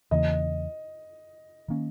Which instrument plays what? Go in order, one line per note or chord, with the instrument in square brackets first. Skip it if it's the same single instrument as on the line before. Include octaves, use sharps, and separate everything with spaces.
[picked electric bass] E2 C#3 E3 A#3 [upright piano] D#5
[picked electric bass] D#3 A#3 C#4